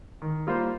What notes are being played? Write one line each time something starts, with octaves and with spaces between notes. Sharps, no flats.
D#3
G3 A#3 F4 C5